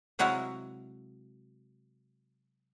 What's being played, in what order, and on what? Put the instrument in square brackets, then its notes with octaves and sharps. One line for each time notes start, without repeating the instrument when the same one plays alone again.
[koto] C3 F#3 G#3 E4 F#4 F5